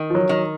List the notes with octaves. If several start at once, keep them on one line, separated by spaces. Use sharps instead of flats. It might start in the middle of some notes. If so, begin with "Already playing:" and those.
Already playing: D#3
F3
F#3
D#3